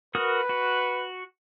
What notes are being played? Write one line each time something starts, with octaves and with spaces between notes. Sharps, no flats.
F#4 A#4 B4 D#6
F#4